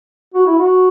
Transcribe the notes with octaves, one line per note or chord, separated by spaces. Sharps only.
F#4
E4
F#4